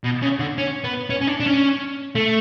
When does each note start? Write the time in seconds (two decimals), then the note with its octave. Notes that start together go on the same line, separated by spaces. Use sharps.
0.04 B2
0.22 C#3
0.39 D3
0.58 C#4
0.84 B3
1.10 C#4
1.21 C#4
1.27 D4
1.40 D4
1.46 C#4
2.15 A3